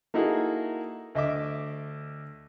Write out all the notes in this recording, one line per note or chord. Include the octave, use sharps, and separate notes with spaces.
A#3 D#4 E4 F#4 G#4 A4
D2 D#5 E5 D6